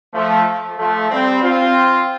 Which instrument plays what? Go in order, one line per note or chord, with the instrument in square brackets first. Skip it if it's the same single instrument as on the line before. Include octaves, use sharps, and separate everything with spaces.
[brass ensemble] F3 A3
F3 A3
G3 C4
C4 F4